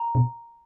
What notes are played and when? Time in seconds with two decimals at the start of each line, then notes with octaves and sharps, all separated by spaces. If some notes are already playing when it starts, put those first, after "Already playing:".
Already playing: A#5
0.15 B2